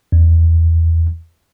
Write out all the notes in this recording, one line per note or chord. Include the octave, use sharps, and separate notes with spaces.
E2